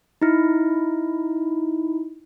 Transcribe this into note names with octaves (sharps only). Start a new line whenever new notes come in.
D#4 E4